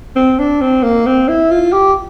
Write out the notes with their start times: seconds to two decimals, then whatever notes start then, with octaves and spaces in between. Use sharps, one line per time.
0.16 C4
0.39 D4
0.61 C4
0.83 A#3
1.07 C4
1.28 E4
1.51 F4
1.73 G4